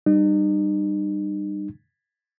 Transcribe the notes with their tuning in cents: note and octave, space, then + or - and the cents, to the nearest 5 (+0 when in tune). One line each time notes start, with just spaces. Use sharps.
G3 +0 D#4 -40